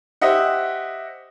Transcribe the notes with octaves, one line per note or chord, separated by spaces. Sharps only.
G4 C5 D#5 E5 F#5